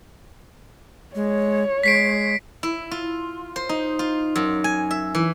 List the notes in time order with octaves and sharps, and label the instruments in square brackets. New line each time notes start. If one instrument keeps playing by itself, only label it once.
[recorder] G#3 [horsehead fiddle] C#5
[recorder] G#3 [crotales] B6 C7 D7
[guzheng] E4
F4
C5
D#4
F4
F#2
G#5
E5
E3